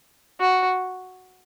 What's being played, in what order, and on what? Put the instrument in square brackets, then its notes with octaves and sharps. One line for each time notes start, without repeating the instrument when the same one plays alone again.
[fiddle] F#4